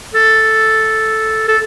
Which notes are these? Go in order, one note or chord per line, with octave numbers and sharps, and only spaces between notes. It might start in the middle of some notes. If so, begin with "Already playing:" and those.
A4
A4